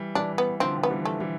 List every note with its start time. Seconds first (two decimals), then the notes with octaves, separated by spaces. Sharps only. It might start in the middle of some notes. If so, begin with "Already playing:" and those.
Already playing: E3 G3
0.15 E3 G3 D4
0.38 B3
0.60 D3 F3 C4
0.83 B3
0.90 E3 G3
1.05 A3
1.20 E3 G3